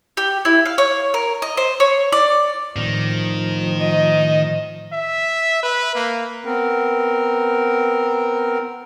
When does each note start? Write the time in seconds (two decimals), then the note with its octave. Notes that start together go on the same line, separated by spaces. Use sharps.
0.17 G4
0.45 E4
0.66 F5
0.78 C#5
1.14 A#4
1.42 D#5
1.57 C5
1.80 C#5
2.12 D5
2.76 A2 D#3 F3 C4
3.81 D#5
4.93 E5
5.63 B4
5.95 A#3
6.45 B3 C4 A#4